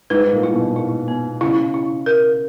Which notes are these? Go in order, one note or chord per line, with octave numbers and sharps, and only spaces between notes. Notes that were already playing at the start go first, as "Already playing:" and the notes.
G#2 B4
A#2
E4
B2
A#2 E4
B3
C#3 E4
E4
A#4